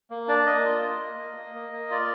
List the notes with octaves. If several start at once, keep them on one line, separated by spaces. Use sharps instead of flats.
A#3
D4 D5
A#3 D#5
F4
A#3
A#3
A#3
A#3
A#3
A#3
F4 D5